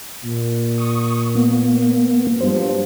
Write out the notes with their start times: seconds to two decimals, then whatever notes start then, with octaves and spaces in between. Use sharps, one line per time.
0.24 A#2
0.78 C#6 D#6
1.35 A#3 B3
2.41 G2 F3 F#3 C5